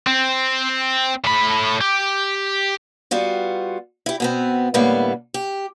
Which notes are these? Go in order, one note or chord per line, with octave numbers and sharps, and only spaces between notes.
C4
A2 B5
G4
G3 B3 F4 F#4
E4 G4
B2 B3 C4
A2 D3 G3 A#3 B3
G4